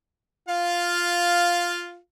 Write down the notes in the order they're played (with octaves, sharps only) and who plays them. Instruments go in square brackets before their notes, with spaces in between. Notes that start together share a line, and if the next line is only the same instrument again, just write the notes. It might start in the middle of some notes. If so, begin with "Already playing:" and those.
[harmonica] F4 F5